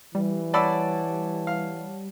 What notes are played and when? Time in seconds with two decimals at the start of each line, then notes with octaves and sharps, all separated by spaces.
0.15 E3 G3
0.54 C#5 D5 F#5 A5 B5 E6
1.47 F5